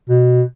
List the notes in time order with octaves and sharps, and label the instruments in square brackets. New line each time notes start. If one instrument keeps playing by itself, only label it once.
[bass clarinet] B2